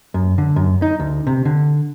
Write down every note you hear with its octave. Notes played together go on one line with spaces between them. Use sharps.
F#2
D3
F#2
D#4
D2
C3
D3